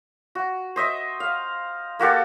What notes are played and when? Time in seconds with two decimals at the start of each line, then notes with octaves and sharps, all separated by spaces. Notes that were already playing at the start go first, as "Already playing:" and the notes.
0.35 F#4
0.76 C5 D#5 E5
1.20 F5
1.99 A#3 F#4 G4 A4